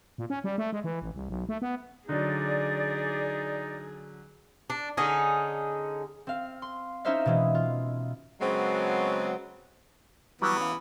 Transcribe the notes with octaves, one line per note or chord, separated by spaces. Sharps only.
A#2
C#4
G3
A3
G#3
E3
A1
C2
B1
A3
B3
D3 F#3 D#4 G#4 D5
D4
D3 C#4 D#4 G#4
C4 F5
C6
C#4 D#4 E4 C5 E5 F5
B2 E3 G#3
F4
C#3 F#3 G#3 B3 C4
E3 F#3 G3 B3 E4
C#4 F5